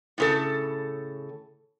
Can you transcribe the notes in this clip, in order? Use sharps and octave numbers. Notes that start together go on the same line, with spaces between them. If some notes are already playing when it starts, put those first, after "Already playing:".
A2 C#3 A4